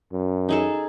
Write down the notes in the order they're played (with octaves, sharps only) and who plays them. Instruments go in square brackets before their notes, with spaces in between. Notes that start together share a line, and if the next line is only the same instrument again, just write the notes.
[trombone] F#2
[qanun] D#4 G#4 A4